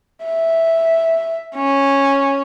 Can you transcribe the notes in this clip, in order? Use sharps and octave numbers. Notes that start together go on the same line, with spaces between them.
E5
C#4